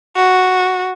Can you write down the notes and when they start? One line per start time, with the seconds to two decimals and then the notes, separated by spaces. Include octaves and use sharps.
0.16 F#4